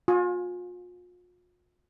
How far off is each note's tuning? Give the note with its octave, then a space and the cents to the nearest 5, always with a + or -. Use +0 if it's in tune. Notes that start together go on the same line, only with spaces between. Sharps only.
F4 +40 G#5 +0